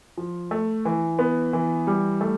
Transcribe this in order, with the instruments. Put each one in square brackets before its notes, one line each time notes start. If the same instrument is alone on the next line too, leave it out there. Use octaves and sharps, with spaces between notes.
[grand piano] F3
A3
E3
B3
E3
G3
A3